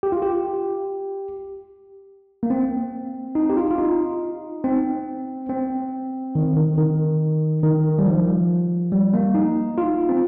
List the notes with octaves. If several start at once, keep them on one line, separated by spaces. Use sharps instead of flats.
G4
F4
G4
A#3
C4
D#4
G4
F4
F4
D#4
C4
C4
D#3
D#3
D#3
D#3
G3
F3
G3
A#3
D#4
F4
C4